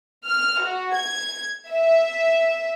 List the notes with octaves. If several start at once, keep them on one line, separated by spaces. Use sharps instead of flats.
F6
F#4
G#6
E5